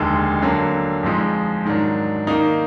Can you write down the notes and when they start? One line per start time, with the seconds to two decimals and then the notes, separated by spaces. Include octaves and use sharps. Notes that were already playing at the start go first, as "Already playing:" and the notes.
Already playing: F1 D#2 D3 G#3
0.42 D3 F#3 A#3
1.03 F2 F3 G#3 D#4
1.65 G#2 D#3 F#3 D4
2.27 D#3 A#3 D#4